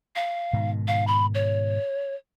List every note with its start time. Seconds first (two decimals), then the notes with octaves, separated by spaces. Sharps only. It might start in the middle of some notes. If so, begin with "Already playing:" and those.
0.16 F5
0.53 G#2 B2 D#3
0.88 F5
1.07 B5
1.34 C#5